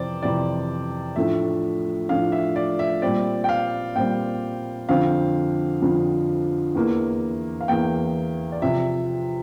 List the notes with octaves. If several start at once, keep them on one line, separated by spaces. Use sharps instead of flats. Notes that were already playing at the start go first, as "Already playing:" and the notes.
Already playing: F2 C3 E3 C5 D5
F2 C3 E3 D5
A2 F3 A3 D4 E5
A2 F3 A3 D4 F5
E5
D5
E5
A#2 G3 C4 D5
G5
F5
A#2 G3 C4 G5
F2 D3 F3 C4 F5
F2 D3 F3 C4
E2 E3 A#3
F5
E2 E3 A#3 G5
D5
C3 F3 C4 E5